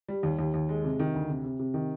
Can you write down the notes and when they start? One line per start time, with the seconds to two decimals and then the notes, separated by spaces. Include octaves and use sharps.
0.08 G3
0.23 D#2
0.39 D#2
0.54 D#2
0.69 G#3
0.84 C3
0.99 D#3
1.14 D2
1.29 C3
1.44 C3
1.59 C3
1.74 D#3